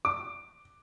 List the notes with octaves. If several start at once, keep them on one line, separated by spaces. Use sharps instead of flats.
D6